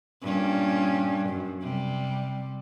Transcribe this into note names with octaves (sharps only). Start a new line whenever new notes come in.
G2 A#2 C#4
F#2
C3 G3